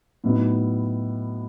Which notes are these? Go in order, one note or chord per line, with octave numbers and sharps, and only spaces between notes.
A2 F#3 B3 D#4